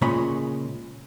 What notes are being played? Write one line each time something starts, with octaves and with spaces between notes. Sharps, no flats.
A#2 C#3 G#3 C#5 D#5 B5